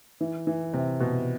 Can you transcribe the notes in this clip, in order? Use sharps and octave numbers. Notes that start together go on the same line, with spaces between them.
E3
E3
C3
B2